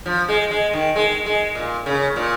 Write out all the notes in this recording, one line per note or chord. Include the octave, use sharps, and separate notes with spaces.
F3
G#3
G#3
D#3
G#3
G#3
A#2
C#3
A#2